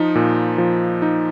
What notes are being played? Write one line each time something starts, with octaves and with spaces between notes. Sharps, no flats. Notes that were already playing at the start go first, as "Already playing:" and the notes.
Already playing: F3 D#4
A#2
F3
D#4